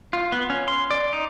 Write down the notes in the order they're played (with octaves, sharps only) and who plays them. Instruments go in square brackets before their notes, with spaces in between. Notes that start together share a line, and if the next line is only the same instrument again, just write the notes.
[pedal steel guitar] F4
B3
C#4
C6
D5
D#4